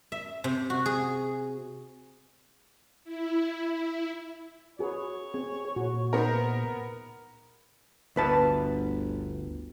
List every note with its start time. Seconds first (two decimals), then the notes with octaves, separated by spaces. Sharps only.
0.12 E5
0.44 C3
0.70 F#4
0.86 G#4
3.04 E4
3.65 E4
4.79 F#4 G#4 B4 C#5
5.34 C4 G#4
5.76 A#2 F#4
6.13 B3 D#4 G#4 A#4 C5
8.16 G1 D2 B4 A5